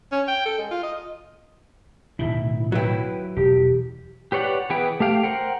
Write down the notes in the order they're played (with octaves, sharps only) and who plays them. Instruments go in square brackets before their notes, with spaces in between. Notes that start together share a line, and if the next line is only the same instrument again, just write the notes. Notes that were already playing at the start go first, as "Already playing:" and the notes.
[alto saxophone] C#4
G5
A4
G#3
F4
D#5
[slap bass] D1 B2 D#3 [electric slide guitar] E4
[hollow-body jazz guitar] F#3 E4 [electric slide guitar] F#4 B4 G5
[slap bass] E1 [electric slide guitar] G4
[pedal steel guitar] G4 B4 C#5 D5 F#5
E3 B3 G#4 B4 G5
A3 G4 F5 G5
A#4 C5 F#5 G5